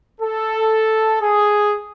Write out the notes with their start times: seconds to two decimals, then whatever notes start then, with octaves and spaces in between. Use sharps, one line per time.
0.21 A4
1.22 G#4